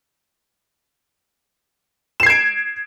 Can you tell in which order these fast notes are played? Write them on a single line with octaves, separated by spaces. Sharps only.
E7 C7 G#6 D7